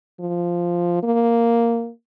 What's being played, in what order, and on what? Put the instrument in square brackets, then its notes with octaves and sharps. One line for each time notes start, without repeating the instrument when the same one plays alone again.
[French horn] F3
A#3